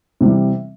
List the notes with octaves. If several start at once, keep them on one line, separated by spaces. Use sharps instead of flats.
C3 E3 G3